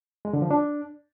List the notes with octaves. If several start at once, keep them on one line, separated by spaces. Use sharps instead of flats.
G#3
D3
F3
D4